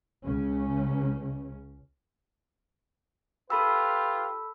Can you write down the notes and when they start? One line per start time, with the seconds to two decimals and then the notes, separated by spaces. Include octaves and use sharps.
0.24 C#2 C#3 C#4
3.50 F4 G4 A4 B4 B5 E6